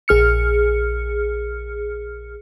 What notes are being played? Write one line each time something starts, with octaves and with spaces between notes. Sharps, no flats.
A#1 G#4 F6 C#7